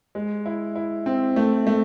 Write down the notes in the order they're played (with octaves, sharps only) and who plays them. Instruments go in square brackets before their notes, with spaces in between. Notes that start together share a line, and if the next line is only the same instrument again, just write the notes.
[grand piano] G#3
E4
E4
C4
A3
A3